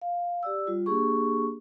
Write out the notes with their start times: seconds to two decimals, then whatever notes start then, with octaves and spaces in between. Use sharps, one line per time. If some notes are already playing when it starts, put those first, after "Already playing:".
0.02 F5
0.43 G4 D5 E6
0.67 G3 F4
0.86 A#3 D4 G4 G#4 C#6